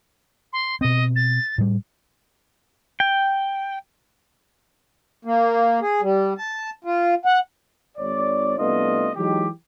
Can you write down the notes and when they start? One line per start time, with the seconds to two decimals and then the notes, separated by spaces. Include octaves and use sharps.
0.53 C6
0.81 B2 C4 D#5
1.16 A6
1.58 A2 G3
3.00 G5
5.25 A#3
5.81 G#4
6.02 G3
6.38 A5
6.84 F4
7.25 F#5
7.97 G#1 C#5 D5
8.57 C2 A3 B3 D4 F4 D#5
9.16 E3 F#3 G#3 D#4 G4